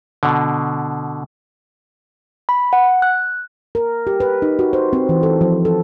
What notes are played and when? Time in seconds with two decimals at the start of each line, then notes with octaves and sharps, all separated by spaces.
0.23 B2 D3
2.49 B5
2.73 F#5
3.02 F#6
3.75 A#4
4.07 G4
4.20 B4
4.42 D#4
4.59 F#4
4.73 C5
4.93 C4
5.09 E3
5.23 A4
5.41 F3
5.65 A4